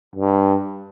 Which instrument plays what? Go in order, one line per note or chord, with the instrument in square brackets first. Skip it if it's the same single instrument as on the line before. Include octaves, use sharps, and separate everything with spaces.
[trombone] G2